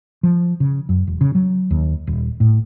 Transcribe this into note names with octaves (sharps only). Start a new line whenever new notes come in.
F3
C#3
F#2
E1
C#3
F#3
D#2
D#1
A2